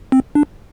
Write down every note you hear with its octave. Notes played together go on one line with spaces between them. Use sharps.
C4
D4